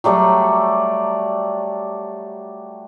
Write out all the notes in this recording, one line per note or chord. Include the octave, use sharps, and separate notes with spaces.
F#3 G3 A3 D5